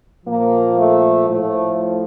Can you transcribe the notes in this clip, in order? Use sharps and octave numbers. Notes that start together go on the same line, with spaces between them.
A#2 F3 A#3
A3
A2 F3 A3